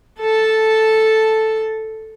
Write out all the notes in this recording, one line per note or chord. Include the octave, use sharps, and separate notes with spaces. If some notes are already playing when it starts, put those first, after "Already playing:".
A4 A5